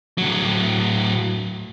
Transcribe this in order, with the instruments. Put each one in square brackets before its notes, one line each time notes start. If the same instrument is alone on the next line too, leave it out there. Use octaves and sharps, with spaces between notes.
[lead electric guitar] A2 F#3